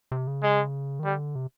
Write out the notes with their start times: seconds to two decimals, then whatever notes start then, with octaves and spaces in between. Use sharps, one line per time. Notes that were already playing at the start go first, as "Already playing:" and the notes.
0.12 C3
0.27 C#3
0.43 G#3
0.99 D#3
1.05 D3 G3
1.35 C3